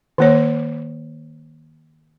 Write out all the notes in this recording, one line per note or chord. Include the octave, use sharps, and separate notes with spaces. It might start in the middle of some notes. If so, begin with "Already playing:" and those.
D#3 A#3 C#5